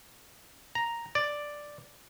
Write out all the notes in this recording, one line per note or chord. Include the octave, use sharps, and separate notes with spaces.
A#5
D5